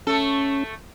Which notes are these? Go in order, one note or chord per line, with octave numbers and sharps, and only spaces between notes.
A3 C#4 A4